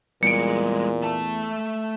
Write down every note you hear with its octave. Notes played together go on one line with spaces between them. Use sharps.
E2 A#2 G3 G#3 C#7 D7
A3 A5